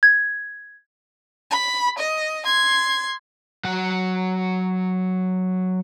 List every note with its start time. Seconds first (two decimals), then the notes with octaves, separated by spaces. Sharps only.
0.03 G#6
1.51 B5
1.99 D#5
2.45 C6 G#6
3.64 F#3 F#5